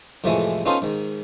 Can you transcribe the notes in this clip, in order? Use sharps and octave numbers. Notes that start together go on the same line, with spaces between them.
F2 A2 C3 E3 G#3 A3
B3 C#4 D#4 F4 A4 C5
G#2 D#3